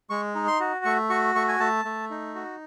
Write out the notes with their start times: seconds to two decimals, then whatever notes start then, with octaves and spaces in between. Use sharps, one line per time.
0.10 G#3 C#6
0.35 D#4
0.48 C6
0.60 F#4
0.85 A3 C#6
1.10 F#4 C#6
1.35 A3 C#6
1.48 G#5
1.60 A3 A5
1.85 A3
2.10 D#4
2.35 F#4